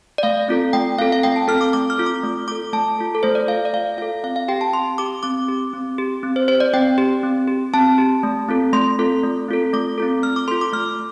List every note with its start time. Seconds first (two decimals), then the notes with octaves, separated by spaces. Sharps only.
0.18 D5
0.23 A3 F5
0.48 C4 F4 A4
0.73 A3 G5
0.98 C4 F4 A4 F5
1.12 F5
1.23 A3 G5
1.36 A5
1.48 C4 F4 A4 F6
1.61 D6
1.73 A3 D6
1.90 F6
1.98 C4 F4 A4
2.06 D6
2.23 A3
2.48 F4 A4 D6
2.73 A3 A5
2.98 F4 A4
3.15 A4
3.23 A3 C5
3.35 D5
3.48 F4 A4 F5
3.65 D5
3.73 A3 F5
3.98 F4 A4 F5
4.24 C4 F5
4.36 F5
4.48 G4 G5
4.61 A5
4.73 C4 C6
4.98 G4 D6
5.23 C4 D6
5.48 G4
5.73 C4
5.98 G4
6.23 C4
6.36 C5
6.48 G4 C5
6.60 D5
6.73 C4 G5
6.98 G4
7.23 C4
7.48 G4
7.74 C4 A5
7.98 G4
8.23 A3
8.49 C4 F4 A4
8.73 A3 C6
8.98 C4 F4 A4
9.23 A3
9.49 C4 F4 A4
9.73 A3 D6
9.98 C4 F4 A4
10.23 A3 F6
10.36 D6
10.48 F4 A4 C6
10.61 D6
10.73 A3 F6